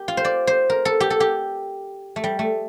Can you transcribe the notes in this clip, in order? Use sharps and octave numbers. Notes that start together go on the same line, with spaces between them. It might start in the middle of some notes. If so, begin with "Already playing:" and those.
Already playing: G4 A#4
F4
C5
D5
C5
A#4
A4
G4
A4
G4
A3
G3
A3